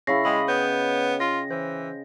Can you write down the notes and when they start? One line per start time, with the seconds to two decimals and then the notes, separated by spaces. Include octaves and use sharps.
0.07 C#3 E4 E5 F5 B5 C#6 A#6 C7
0.25 G#3 D#5 G5 B5 D#6
0.48 B3 C#5 G6
1.20 F4 A#6
1.51 E3 C5